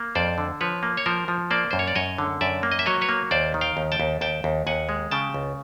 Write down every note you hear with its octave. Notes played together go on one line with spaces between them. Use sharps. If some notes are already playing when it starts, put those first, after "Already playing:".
Already playing: A#3
F2 C5 D5
D3
F3 B4 C#5
A#3
C#5
F3 A#4 C5
F3
A#3 C5 D5
F#2 C5
C#5
D5
F#2 C#5 D#5
D3
F#2 D5 E5
A#3
D#5
E5
F#3 C#5 D#5
B4 C#5
A#3
D#2 C5 D5
D#3
F5 G5
D#2
G5 A5
D#2
D#2 G5 A5
D#2
D#2 F#5 G#5
G#3
C#3 G5 A5
C#2